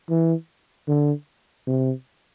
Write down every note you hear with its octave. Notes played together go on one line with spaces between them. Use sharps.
E3
D3
C3